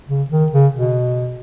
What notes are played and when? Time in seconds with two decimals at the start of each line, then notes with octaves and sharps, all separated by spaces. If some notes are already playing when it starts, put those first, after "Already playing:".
0.08 C#3
0.30 D#3
0.52 C#3
0.74 B2